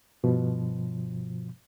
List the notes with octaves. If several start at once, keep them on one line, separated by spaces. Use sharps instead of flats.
G2 B2 F3